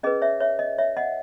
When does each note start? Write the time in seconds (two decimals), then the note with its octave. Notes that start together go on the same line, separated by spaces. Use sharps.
0.03 C#4 G#4 B4 D#5
0.22 C#5 E5
0.40 C#5 E5
0.59 D#5
0.78 C#5 E5
0.97 D#5 F#5